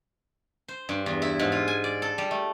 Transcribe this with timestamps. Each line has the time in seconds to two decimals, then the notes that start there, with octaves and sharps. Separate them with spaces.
0.68 C5
0.89 G2
1.06 E2
1.22 E4
1.39 G#2
1.52 F4
1.68 G#5
1.84 D5
2.02 A4
2.18 G3
2.31 A3